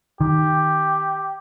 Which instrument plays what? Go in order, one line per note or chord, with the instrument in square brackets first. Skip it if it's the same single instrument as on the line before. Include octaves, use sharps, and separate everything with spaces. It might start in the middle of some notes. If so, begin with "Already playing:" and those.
[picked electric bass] D#3 [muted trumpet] G4